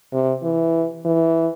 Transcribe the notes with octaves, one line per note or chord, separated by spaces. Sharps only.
C3
E3
E3